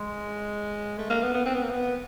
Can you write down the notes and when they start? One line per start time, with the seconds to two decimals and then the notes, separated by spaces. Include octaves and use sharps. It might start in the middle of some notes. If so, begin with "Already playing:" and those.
Already playing: G#3
0.98 A3
1.10 A#3
1.22 B3
1.34 B3
1.46 C4
1.54 B3
1.63 A#3
1.70 B3